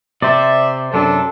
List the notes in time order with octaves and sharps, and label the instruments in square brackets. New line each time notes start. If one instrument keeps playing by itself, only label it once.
[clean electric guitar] C3 [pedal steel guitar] C5 D5 [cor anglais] E5
[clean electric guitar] F#2 C3 [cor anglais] D4 [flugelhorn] A4